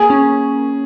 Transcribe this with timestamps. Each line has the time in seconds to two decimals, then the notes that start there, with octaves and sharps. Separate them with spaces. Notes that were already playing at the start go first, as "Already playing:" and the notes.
Already playing: A#3 G#4
0.10 C#4